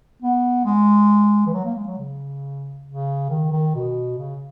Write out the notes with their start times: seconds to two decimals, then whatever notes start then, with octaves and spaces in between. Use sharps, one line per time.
0.22 B3
0.65 G#3
1.46 E3
1.54 F#3
1.65 A#3
1.75 G#3
1.87 F#3
1.98 C#3
2.86 C#3
3.30 D#3
3.52 D#3
3.75 B2
4.18 C#3